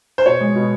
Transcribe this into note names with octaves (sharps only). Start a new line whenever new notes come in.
C5
B2 C#5
G#3
B2